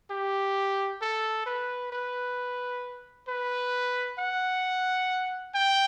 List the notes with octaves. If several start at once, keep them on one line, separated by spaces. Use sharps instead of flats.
G4
A4
B4
B4
B4
F#5
G5